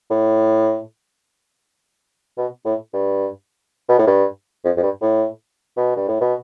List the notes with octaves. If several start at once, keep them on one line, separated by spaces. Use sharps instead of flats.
A2
B2
A2
G2
B2
A2
G2
F2
F2
G2
A2
B2
G2
A2
B2